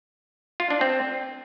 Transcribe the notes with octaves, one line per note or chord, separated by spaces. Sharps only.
F4
D4
C4